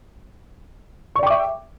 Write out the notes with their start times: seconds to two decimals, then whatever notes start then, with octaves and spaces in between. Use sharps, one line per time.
1.16 C#6
1.19 D5
1.23 G5
1.26 D6
1.30 E5